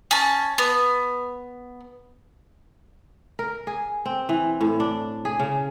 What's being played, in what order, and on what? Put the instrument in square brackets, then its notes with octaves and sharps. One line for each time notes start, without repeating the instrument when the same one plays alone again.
[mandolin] C#4 A5
B3
[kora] A#4
G#4
C4
E3
A2
D4
G#4
C#3